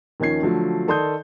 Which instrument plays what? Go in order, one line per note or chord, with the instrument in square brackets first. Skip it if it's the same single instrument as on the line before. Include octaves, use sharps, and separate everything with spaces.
[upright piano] D#2 D#3 F3 C#4 G#6 C7
D3 F3 F#3 A3
D#3 A4 D5 C6 D#6 G6